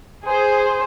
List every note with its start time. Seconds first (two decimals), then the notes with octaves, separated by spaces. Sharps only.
0.24 G#4 C5